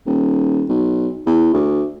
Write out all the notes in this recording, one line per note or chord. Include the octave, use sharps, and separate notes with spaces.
D#1
B1
E2
D2